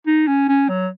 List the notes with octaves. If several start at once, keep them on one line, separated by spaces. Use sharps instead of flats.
D#4
C#4
C#4
F#3